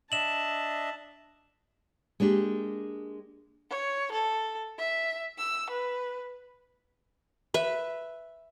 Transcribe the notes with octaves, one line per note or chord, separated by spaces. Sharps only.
D4 D#5 E5 A5 E7 F#7
G#3 A#3 D4 G4
C#5
A4
E5
E6
B4
B4 E5